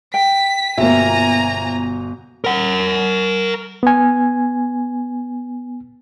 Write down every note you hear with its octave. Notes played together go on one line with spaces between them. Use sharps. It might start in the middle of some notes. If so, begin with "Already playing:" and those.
G5 B6
G1 B2 A#3 C5 E5 G#5 A#5
A#4 F#5
B3 G#5